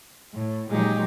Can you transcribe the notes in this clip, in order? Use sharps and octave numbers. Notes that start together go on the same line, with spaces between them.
A2
A#2 F3 F#3 G#3 D#4 G4